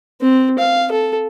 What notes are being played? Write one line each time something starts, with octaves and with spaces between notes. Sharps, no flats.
C4
F5
A4